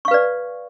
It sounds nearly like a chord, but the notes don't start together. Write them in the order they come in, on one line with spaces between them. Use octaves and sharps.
C#6 F5 B4 D5